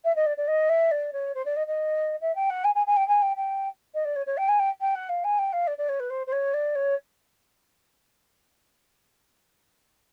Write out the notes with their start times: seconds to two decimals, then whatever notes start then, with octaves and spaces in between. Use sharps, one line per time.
0.05 E5
0.16 D#5
0.26 D5
0.37 D5
0.48 D#5
0.69 E5
0.91 D5
1.13 C#5
1.35 C5
1.45 D5
1.56 D#5
1.67 D#5
2.21 E5
2.35 G5
2.50 F#5
2.64 G#5
2.75 G#5
2.87 G#5
2.97 G5
3.08 G#5
3.22 G5
3.37 G5
3.94 D#5
4.05 D5
4.16 C#5
4.26 C#5
4.37 G5
4.48 G#5
4.59 G5
4.81 G5
4.95 F#5
5.09 F5
5.24 G#5
5.39 G5
5.53 F5
5.67 D5
5.78 D5
5.89 C#5
6.00 B4
6.10 C5
6.27 C5
6.32 C#5
6.54 D5
6.75 C#5